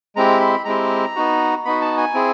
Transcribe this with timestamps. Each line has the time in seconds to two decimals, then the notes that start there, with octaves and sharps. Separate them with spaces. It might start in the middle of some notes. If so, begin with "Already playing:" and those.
0.16 G#3 C4 E4 G4 A#5
0.40 B5
0.65 G#3 C4 E4 G4 A#5
1.16 B3 D#4 F#4
1.65 B3 D#4 F#4 B5
1.81 A5
1.97 G#5
2.14 C4 E4 G#4